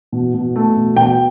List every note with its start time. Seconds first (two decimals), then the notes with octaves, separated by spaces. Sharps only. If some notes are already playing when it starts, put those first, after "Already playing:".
0.12 B2
0.34 B2
0.56 A3
0.77 B2
0.96 B2 G5